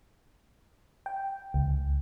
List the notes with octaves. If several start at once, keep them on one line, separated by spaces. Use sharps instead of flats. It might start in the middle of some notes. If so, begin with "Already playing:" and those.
G5
C#2